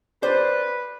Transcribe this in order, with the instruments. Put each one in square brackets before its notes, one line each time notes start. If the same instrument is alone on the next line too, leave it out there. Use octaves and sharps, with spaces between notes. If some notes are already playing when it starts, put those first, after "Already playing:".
[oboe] B4 [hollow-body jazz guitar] C5 [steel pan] D5